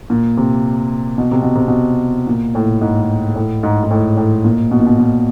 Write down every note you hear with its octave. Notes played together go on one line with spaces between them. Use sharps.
A#2
C3
B2
C3
B2
C3
B2
A#2
A2
G#2
A2
G#2
G#2
A2
A2
A#2
B2
A#2
B2
A#2